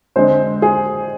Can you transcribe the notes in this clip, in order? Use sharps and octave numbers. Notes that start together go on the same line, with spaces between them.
D3 G#3 C4 C5
G#4